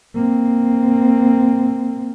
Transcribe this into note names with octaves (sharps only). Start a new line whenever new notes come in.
A#3 C4